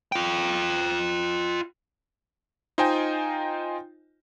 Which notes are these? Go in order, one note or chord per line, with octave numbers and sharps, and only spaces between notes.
F4 G5
D#4 F4 C5 D#5 G5 G#5